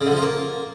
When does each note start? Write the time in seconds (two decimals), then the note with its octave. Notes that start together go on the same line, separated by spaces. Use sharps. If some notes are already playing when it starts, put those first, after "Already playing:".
0.01 C#3
0.06 D3
0.11 F3
0.17 F4
0.22 A#3